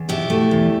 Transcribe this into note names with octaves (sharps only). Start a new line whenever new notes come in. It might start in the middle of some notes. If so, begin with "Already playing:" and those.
Already playing: E2
B2 E4 G4
A3
E2